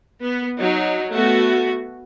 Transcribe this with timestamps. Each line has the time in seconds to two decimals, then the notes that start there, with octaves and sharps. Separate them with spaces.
0.23 B3
0.56 F#3 D#4
1.13 A3 B3 F#4